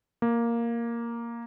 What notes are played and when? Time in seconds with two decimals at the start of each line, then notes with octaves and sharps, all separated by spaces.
0.22 A#3